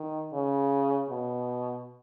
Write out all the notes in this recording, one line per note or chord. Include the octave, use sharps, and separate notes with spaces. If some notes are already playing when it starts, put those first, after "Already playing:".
Already playing: D#3
C#3
B2